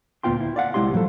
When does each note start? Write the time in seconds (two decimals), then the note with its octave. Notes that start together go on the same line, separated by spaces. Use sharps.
0.23 D2 A#2 B3 F4 G5 C6
0.41 E4
0.56 D5 F5 F#5
0.74 C2 C#3 G#3 E4 G4 C6
0.94 A2 F3 F#3 A4